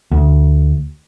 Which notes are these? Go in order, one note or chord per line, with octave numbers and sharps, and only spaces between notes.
D2